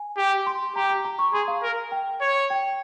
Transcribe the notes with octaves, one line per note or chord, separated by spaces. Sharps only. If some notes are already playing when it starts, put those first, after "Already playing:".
Already playing: G#5
G4
C6
G4 A#5
A#5
A#5
C#6
G#4 C6
F5
A#4
G5
C#5
G5